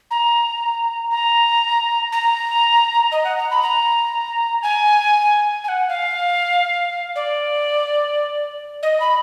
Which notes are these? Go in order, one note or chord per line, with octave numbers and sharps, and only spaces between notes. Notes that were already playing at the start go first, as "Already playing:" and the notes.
A#5
A#5
A#5
D#5
F#5
A#5
B5
A#5
G#5
G#5
F#5
F5
D5
D#5
B5